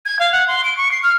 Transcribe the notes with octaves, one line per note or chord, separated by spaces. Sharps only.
G#6
F5
F#5
C6
D7
C#6
C7
F6